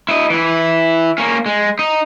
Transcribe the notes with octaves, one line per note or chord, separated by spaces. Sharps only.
E4 D#5
E3 E4
A#3 C#4
G#3
D#4